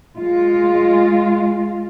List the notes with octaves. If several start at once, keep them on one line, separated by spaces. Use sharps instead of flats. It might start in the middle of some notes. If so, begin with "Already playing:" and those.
G#3 F4